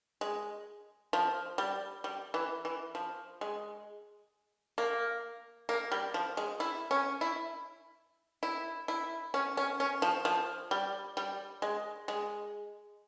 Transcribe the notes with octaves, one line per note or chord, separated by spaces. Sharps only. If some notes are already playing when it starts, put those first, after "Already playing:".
G#3
F3
G3
G3
E3
E3
F3
G#3
A#3
A#3
G3
F3
G#3
E4
C#4
E4
E4
E4
C#4
C#4
C#4
F3
F3
G3
G3
G#3
G#3